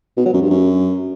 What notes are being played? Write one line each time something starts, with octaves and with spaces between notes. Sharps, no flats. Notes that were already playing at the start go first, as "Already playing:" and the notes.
B2
F#3
F#2
G2
F#2